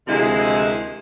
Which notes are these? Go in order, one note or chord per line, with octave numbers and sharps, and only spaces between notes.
D2 C3 D#3 F3 G#3 E4